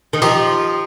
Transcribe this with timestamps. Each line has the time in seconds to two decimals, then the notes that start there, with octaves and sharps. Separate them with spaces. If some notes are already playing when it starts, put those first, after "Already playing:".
0.13 D#3
0.22 F3 D#4 G4